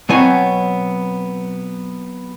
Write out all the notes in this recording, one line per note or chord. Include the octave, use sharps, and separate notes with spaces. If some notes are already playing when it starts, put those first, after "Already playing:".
B2 F#3 B3 C4 C#5 G#5